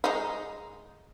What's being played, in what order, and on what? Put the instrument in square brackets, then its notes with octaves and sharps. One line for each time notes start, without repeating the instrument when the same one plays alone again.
[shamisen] G#3 D#4